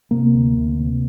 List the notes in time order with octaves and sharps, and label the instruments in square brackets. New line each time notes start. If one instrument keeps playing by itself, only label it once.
[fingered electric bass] C3 A#3
D2
D2
C3